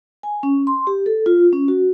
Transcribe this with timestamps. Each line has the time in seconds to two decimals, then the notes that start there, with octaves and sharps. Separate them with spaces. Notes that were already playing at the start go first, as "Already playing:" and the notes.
0.23 G#5
0.43 C#4
0.67 C6
0.87 G4
1.06 A4
1.26 F4
1.53 C#4
1.68 F#4